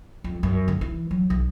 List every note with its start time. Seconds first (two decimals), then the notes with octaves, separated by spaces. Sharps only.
0.24 F2
0.43 F#2
0.68 D3
0.81 E3
1.11 F#3
1.30 B1